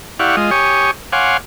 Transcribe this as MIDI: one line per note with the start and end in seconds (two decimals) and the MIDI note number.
0.20 0.36 64
0.20 0.36 67
0.20 0.36 74
0.20 0.36 77
0.20 0.36 78
0.20 0.36 85
0.37 0.51 56
0.37 0.51 65
0.37 0.51 75
0.51 0.91 67
0.51 0.91 73
0.51 0.91 80
0.51 0.91 85
0.51 0.91 87
1.13 1.37 73
1.13 1.37 77
1.13 1.37 78
1.13 1.37 80
1.13 1.37 84
1.13 1.37 86